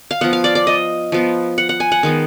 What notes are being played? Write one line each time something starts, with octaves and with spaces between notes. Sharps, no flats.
F5
F3 B3 F#5
F5
D5
D5
D#5
F3 B3
F#5
F#5
G#5
F#5
D#3 G#3 B3